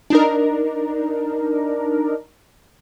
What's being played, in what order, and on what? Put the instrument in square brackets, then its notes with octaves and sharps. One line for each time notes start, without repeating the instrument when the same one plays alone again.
[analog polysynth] D4 D#4 A#4